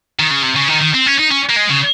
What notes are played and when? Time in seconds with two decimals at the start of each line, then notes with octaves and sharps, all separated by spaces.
0.19 D#3
0.30 C#3
0.42 C3
0.55 C#3
0.68 D#3
0.81 D#3
0.94 C4
1.06 C#4
1.19 D#4
1.32 C#4
1.50 A#3
1.57 G#3
1.70 C#3